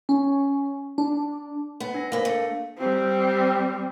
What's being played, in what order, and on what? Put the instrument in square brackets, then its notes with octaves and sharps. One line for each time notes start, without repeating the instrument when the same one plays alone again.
[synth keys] C#4
D4
[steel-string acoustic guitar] B3
[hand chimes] D4 A#6
[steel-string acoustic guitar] D2 B4 [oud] A#3
[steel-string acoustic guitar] A3
[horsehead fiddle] G3 C4